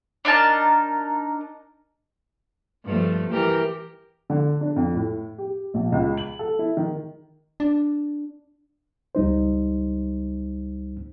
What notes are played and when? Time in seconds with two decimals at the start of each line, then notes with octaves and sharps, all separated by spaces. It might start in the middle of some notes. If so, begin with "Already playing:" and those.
0.25 D4 D#4 A#4 A5
2.85 G2 F3 A3
3.31 E3 G4 A#4
4.30 D3
4.61 D4
4.76 F2
4.95 A2
5.38 G4
5.74 A#1
5.92 C#2
6.17 F#7
6.39 A4
6.59 E4
6.77 D#3
7.60 D4
9.15 C#2 G3 D#4 C5